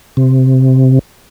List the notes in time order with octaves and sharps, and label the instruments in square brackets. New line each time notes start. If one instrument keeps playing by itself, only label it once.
[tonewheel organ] C3